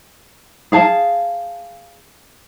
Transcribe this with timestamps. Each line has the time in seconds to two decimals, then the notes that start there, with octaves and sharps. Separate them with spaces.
0.72 G#4 F5 A5